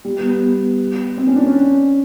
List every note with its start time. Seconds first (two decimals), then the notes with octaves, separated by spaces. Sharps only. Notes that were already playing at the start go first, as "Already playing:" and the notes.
0.05 G3
0.18 B3
0.30 B3
1.17 C4
1.27 C#4
1.36 D4
1.46 C#4